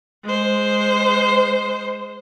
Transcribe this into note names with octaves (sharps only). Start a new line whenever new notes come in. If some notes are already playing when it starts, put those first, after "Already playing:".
G#3 C5